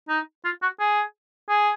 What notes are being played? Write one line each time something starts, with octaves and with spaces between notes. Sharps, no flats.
D#4
F4
F#4
G#4
G#4